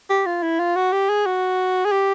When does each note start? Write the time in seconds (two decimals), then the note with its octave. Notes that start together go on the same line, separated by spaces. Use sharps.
0.10 G4
0.26 F4
0.43 E4
0.59 F4
0.76 F#4
0.92 G4
1.09 G#4
1.26 F#4
1.85 G#4
1.92 G4